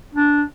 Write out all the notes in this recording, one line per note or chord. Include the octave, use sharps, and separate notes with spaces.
D4